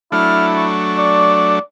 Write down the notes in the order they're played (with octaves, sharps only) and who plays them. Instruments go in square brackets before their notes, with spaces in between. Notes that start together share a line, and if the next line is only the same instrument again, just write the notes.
[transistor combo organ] F#3 A3 D4 [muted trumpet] E4 [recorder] F6
[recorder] C#6
[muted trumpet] D5